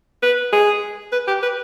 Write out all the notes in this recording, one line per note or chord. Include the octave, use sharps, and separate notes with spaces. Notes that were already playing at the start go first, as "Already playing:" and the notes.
B4
G#4
B4
G4
B4